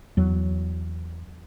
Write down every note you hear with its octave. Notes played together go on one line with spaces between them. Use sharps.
E2 F#3